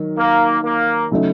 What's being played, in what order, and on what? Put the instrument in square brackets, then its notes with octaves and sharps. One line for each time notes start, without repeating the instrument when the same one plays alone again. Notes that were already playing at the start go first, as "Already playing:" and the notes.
Already playing: [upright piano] D#3 F#3
[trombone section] A#3
A#3
[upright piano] C#3 F#3 A3 D#4